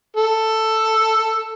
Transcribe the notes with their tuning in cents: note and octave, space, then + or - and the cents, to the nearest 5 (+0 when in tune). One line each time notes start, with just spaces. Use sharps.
A4 +5